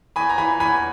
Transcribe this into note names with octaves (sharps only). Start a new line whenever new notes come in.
E2 G#5 B5
A#5
E3 G#5 B5
E2 G#5 B5